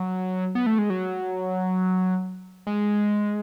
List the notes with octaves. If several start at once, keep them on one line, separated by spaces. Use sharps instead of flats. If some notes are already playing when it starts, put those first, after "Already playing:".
Already playing: F#3
B3
A3
G#3
F#3
G#3